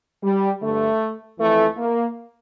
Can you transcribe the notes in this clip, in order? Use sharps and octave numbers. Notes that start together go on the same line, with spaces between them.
G3
G2 D3 A3
F2 E3 A3
A#3